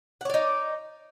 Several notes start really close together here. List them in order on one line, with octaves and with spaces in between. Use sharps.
F#5 C#5 D5 D#4